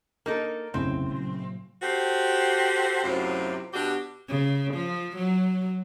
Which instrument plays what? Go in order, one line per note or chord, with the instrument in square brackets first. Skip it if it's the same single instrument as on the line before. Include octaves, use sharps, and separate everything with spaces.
[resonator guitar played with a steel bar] A#3 D#4 A4 [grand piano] A#4
[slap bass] F1 B1 F2 [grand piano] A2 C#3 [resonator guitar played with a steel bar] C4
[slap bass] A#2 F#3
[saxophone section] F#4 G4 A4 C5
F#2 A2 C3 F#3 C4 F4
B2 D4 F#4 G4
[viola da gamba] C#3
F3
F#3